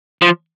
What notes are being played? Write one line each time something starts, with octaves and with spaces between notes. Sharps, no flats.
F3